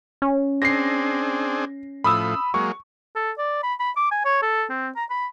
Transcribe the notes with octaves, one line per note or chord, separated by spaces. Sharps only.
C#4
C4 D4 G#4 A#6 C7
A2 F3 B5 D#6 E6
F#3 G#3 A#3 C#6
A4
D5
B5
B5
D6
G#5
C#5
A4
C4
A#5
B5